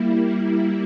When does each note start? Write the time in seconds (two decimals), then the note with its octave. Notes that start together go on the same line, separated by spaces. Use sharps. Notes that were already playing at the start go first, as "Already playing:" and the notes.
Already playing: G3 A#3 E4